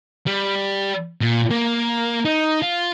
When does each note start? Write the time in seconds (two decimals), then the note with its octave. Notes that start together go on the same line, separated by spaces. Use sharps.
0.27 G3
1.21 A#2
1.51 A#3
2.25 D#4
2.62 F4